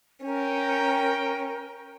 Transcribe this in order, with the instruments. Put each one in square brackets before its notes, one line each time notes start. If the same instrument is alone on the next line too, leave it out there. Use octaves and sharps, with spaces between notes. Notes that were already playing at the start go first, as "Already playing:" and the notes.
[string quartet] C#4 [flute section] A#4 [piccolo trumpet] G5